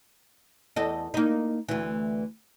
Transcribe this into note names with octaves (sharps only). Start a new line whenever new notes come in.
E2 A4 D#5
A#3 D#4
D2 E3